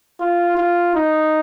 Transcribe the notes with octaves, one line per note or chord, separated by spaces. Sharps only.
F4
F4
D#4